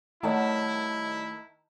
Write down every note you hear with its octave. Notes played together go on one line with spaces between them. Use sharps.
D#3 G3 A3 D#4 E4 C#5 F#5 A5